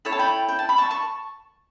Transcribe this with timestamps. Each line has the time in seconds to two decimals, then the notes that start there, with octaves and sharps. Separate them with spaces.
0.05 E4 A4 C#5 B5
0.12 A5
0.19 G5 B5
0.48 G5
0.59 A5
0.69 B5
0.78 A5 C#6
0.91 A5 C#6